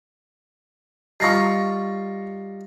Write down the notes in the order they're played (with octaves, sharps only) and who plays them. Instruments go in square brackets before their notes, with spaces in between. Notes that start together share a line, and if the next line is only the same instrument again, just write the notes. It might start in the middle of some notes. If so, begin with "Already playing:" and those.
[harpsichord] G3 D#4 F4 [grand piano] C#6 A#6 C7